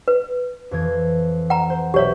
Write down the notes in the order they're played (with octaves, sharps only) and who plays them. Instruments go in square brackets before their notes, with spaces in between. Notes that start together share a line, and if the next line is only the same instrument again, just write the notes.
[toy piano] B4
[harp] F2 E3 G#6
[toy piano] F#5 A#5
[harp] C5
[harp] B1 E5 [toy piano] G4 C#5